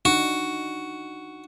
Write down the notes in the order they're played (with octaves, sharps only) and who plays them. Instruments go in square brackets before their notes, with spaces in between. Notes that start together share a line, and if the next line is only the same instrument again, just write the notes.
[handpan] D4 D#4 [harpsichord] F#4